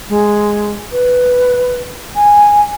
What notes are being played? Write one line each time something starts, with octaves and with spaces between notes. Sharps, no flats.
G#3
B4
G#5